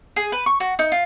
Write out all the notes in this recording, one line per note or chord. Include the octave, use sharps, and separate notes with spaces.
G#4
B4
C#6
F#4
D#4
F4